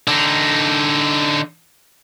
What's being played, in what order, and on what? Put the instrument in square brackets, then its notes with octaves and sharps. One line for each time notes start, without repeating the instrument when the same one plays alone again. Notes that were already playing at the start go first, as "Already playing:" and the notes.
[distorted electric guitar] D3 D#4